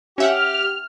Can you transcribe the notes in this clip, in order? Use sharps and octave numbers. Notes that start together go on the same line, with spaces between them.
C#4 G4 E5 F#5 F6